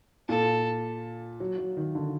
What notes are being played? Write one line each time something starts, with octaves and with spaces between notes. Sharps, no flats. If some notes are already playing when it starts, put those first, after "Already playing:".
A#2 A4
F#3
F#3
D#3
D3